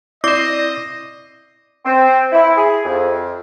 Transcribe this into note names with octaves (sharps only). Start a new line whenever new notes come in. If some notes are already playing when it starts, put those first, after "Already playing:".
C4 E4 C5 D5 D#5 D6
C4
E4
G#4
F2